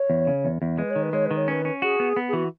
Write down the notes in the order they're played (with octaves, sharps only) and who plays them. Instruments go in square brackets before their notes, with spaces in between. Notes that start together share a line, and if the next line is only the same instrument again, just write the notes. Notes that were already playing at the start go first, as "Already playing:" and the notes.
Already playing: [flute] C#5
[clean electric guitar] E2
C#3
E2
E2
[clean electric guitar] G#3 [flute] B4
[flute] C#5
[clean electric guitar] D#3
[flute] B4
[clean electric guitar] G#3 [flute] C#5
[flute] B4
[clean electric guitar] D#3
[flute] C#5
[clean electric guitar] C#4 [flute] B4
[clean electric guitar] C#4
[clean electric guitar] F#4 [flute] G#4
[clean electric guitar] B3
B3
[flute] G#4
[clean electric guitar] E3 [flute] F#4